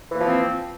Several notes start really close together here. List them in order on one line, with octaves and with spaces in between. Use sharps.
E3 A#3 F3 C4